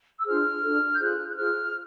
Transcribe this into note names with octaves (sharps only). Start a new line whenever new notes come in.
E6
D4 F4 G#4 C5 F6
D4 F#4 A4
G6
F4 G#4 C5 F#6
F#6
F4 G#4 C5 F6